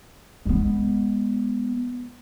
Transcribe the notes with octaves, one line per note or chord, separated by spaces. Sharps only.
G#3 B3